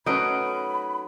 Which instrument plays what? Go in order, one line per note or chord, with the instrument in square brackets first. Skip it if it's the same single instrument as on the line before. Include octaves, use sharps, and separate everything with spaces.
[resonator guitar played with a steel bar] F#3 A3 C#4 [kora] D#4 B4 [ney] B5 [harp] D#6 D7